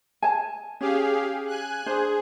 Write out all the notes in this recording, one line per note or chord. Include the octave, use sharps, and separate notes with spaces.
G#5 A5
C#4 G4 G#4 F5
G#5 F#6
D4 G#4 C5